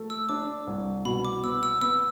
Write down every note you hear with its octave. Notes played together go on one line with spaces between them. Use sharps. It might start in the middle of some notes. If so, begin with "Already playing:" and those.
Already playing: A3
E6
D4 D6
C2
B2 B5
D6
B3 E6
E6
B3 E6